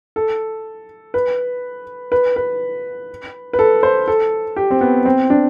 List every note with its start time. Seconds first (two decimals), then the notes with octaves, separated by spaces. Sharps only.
0.16 A4
1.14 B4
2.12 B4
2.36 B4
3.53 B4
3.59 A4
3.83 C5
4.08 A4
4.56 G4
4.71 C4
4.81 B3
5.05 C4
5.30 D4